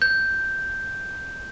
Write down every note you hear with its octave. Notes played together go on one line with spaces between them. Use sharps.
G6